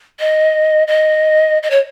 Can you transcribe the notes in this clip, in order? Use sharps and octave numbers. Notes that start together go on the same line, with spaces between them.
D#5
D#5
D#5
C#5